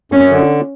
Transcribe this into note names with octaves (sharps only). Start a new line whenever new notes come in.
F#2 C#4
D3